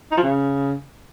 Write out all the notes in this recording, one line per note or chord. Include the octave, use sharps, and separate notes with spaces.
D#4
F3
C#3